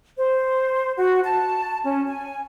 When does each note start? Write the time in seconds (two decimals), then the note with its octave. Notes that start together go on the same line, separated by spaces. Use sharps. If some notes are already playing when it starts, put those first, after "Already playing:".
0.17 C5
0.96 F#4
1.23 A5
1.84 C#4
2.07 G#5